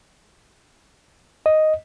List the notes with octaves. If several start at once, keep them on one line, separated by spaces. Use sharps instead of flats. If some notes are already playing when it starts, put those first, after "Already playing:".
D#5